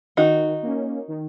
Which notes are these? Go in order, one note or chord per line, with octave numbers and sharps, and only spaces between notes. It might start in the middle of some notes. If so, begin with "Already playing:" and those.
D#3 D#4 F#4
A#3 C#4
D#3